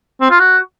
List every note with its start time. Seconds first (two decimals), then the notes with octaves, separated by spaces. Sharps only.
0.21 C4
0.31 F4
0.40 F#4